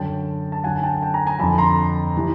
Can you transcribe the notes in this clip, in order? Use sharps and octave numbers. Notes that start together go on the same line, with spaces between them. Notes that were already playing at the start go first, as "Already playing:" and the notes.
Already playing: F#2 D3 G5 A5
A5
F#2 D3 F#5 G#5
G#5
G5 A5
G5 A5
G#5 A#5
G#5 A#5
F2 D3 A5 B5
A#5 C6
C3 E3